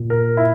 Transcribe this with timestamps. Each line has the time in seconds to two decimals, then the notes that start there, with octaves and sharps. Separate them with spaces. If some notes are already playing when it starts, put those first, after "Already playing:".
Already playing: A#2
0.10 A#4
0.37 E4